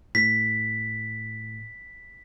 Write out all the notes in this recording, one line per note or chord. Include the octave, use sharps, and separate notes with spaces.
A2 B6